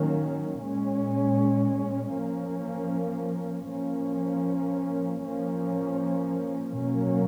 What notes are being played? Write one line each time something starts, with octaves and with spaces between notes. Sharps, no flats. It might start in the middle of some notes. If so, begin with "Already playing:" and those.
Already playing: D#3 F#3 A#3 C#4
A#2 G#3 C#4
F3 A#3 C#4
F3 A#3 C#4
F3 A#3 C#4
B2 F#3 A#3 C#4